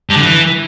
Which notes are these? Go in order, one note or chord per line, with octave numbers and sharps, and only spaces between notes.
G2
D3
E3